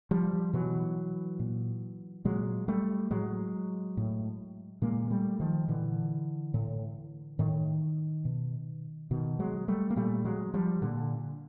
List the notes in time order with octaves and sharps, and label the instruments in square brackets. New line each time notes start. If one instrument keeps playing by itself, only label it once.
[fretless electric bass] F3 G3
B2 E3 F#3
A#2
A#2 F#3 G#3
G3 A3
A2 F#3 G#3
A2
A#2 G#3 A#3
G3 A3
D#3 F3
A#2 D3 E3
A2
A2 D#3
B2
B2 D#3
F#3 G#3
G3 A3
A#3
A#2 G3 A3
F#3 G#3
F3 G3
A#2 D3